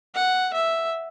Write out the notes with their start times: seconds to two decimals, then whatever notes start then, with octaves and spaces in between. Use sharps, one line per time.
0.15 F#5
0.53 E5